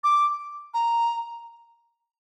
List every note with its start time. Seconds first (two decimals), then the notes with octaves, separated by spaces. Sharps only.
0.04 D6
0.74 A#5